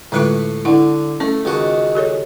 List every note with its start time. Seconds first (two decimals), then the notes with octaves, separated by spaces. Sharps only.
0.12 A2 D3 G#3 F4 B4 C#6
0.65 D3 E4 F#5
1.20 A3 C#4
1.45 C#2 D#3 F#4
1.95 G4 A4 C#5